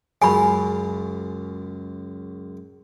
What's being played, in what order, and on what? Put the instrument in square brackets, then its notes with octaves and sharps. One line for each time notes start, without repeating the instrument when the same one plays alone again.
[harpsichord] C#2 F#2 C6 [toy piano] G#5 B5